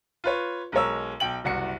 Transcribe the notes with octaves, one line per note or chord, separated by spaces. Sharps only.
F4 B4 C#5
B1 G#3 A#4 C#5 E6
B1 G5 F#7
F#1 C2 F#4 C#7